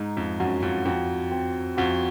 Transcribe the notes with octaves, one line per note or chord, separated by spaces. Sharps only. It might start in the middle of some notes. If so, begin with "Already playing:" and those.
Already playing: G#2 D#4
F2
F#2 F#4
F2
F2 C4
C4
F2 F#4